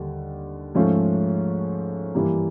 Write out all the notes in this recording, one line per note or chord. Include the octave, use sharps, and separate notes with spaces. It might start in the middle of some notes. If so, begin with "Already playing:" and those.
Already playing: D#2 D3 G3
G#2 F3 A3 C#4 F4
G2 E3 G3 A#3